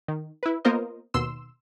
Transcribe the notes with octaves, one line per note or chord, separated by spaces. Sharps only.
D#3
E4 B4
A#3 B3 F4 A#4 C5 D#5
D#2 B2 C6 E6 E7